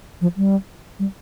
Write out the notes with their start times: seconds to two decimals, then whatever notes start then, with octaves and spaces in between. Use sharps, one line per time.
0.21 F3
0.37 G3
0.99 G3